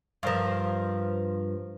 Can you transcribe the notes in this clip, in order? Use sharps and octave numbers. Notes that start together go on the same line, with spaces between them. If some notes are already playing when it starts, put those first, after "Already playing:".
G2 F3 A#4 C5 F5